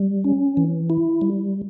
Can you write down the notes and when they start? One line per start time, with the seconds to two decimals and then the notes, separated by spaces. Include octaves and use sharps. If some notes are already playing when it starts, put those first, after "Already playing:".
Already playing: G3
0.24 C#4
0.57 E3
0.90 E4
1.21 G3